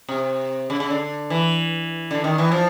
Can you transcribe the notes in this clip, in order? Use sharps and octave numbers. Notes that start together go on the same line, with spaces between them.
C3
C#3
C#3
D3
E3
D3
D#3
E3
F3